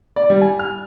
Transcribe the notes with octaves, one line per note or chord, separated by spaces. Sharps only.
D5
G3
G#5
F6